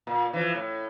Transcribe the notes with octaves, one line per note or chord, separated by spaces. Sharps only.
A#2
E3 F3
A2